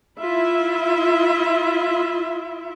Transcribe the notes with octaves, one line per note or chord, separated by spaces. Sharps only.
E4 F4 E5